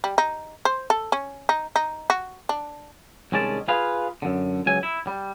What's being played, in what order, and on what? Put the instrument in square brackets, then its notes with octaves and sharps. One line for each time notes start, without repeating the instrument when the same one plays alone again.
[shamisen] G3
D#4
C5
A4
C#4
D#4
D#4
F#4
D4
[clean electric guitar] C2 D#3 G#3 C#4 D5 A5
F4 G#4 B4 F5
F#2 D3
C#2 F#3 G#5
E4
G3